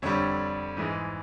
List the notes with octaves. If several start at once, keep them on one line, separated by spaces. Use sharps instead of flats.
F2 D3 G3 C#5
G#2 E3 G#3